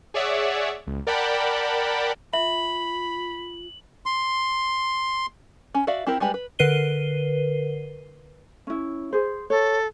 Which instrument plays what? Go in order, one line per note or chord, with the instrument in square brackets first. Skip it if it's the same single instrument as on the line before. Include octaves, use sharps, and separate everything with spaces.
[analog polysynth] G#4 C#5 D5 E5 F#5
C#2
A#4 D5 F#5 G5 A5 B5
[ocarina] F4 [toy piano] E5 [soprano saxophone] B5 [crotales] F#7
[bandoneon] C6
[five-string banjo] C#4
F#4 D5 E5 F5
C4 E4 G4 A#4
G3 G#3 G4 B4
B4
[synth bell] D3 A#4 B4 C7 D#7 G7
[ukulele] C#4 E4
G#4 C5
[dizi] A4 [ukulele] C#5